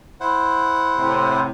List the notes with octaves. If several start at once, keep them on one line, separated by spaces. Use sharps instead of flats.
E4 C5 F#5
A2 C3